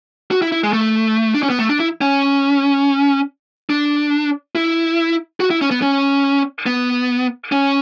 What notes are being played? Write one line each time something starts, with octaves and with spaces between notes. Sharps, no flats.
F#4
E4
E4
G#3
A3
D4
C#4
B3
A3
D4
E4
C#4
D4
E4
F#4
E4
C#4
B3
C#4
B3
C#4